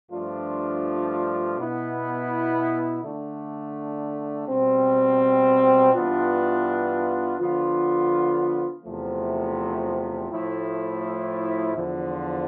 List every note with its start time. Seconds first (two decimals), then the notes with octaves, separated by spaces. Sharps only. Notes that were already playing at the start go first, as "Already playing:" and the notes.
0.11 G2 F3 A3 D4 F4
1.57 B2 B3 E4
3.02 D3 A3 D4
4.47 B2 G3 C4
5.93 G2 E3 B3 D4 F4
7.38 D3 F3 B3 F4
8.84 E2 C3 F3 A3
10.30 A2 F3 A3 E4
11.75 E2 D3 F3